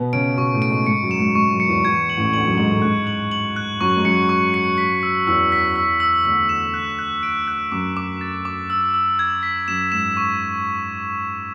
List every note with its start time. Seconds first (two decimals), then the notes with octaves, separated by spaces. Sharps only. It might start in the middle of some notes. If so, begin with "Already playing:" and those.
Already playing: B2 B3
0.13 C#3 C#4 D7
0.37 B2 B3 C#6
0.54 A2 A3
0.62 D7
0.70 G#2 G#3
0.86 G#2 G#3 C#7
1.02 F#2 F#3
1.11 E7
1.19 G#2 G#3
1.35 G#2 G#3 C#6
1.52 F#2 F#3
1.60 C#7
1.68 E2 E3
1.84 E2 E3 G#6
2.10 F#7
2.17 A1 A2
2.33 D2 D3 F#7
2.46 F#2 F#3
2.58 G#2 G#3 F#7
2.70 A2 A3
2.82 G#2 G#3 F#6
3.07 F#7
3.31 F#7
3.56 F#6
3.80 F#2 F#3 C#6
3.97 G#3
4.05 F#2 F#3 C#7
4.29 C#6
4.54 C#7
4.78 B6
5.03 E6
5.27 E2 E3 E6
5.52 B6
5.76 E6
6.00 E6
6.25 D2 D3 E6
6.49 E7
6.74 F#6
6.99 F#6
7.23 D7
7.48 F#6
7.72 F#2 D6
7.97 D6
8.21 A6
8.45 D6
8.70 E6
8.94 E6
9.19 G#6
9.43 B6
9.68 F#2 E7
9.92 G#2 E7
10.17 C#6